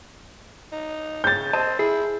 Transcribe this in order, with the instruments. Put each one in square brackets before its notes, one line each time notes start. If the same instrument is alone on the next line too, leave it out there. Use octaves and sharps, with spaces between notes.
[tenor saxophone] D#4
[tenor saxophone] C#3 [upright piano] G6 A6
[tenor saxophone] C4 [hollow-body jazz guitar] D#5 A5
[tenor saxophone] E4 [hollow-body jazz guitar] G#4